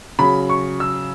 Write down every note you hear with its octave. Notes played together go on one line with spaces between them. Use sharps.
C#3 F#3 B5
C#6
E6